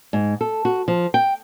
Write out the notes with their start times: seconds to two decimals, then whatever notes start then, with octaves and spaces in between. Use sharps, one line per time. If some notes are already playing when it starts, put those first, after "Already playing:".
0.13 G#2
0.41 A4
0.65 F#4
0.88 F3
1.14 G5